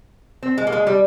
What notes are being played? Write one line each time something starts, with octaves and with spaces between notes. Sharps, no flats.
C4
G#3
A#3
G#3
G3